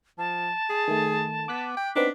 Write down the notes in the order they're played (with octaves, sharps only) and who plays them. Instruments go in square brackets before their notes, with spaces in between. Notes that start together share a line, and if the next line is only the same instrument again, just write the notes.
[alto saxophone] F3 [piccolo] A5
[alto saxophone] G#4
[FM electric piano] D#3 A3
[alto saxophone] B3 [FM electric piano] D6 F#6 B6
[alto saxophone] G5
[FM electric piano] B3 C4 D#4 [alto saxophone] D4 [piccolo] B6